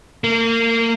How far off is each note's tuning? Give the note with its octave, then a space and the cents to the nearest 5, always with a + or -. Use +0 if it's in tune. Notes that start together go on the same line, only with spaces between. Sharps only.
A#3 -30